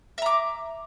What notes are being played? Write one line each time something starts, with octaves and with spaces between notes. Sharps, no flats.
E5 A#5 D6